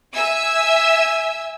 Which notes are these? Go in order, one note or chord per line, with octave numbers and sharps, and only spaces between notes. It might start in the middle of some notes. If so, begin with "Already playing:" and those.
E5 G#5 E6